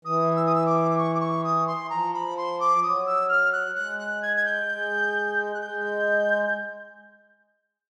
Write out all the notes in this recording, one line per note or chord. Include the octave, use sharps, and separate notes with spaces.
E3 D#6
E6
D#6
E6
D6
C#6
D6
C#6
D#6
C6
F3 A#5
B5
C6
D6
F#3 D#6
E6
F6
F#6
G#3 F#6
F#6
G#6
G#6
G6
G#3
F#6
G#3 G6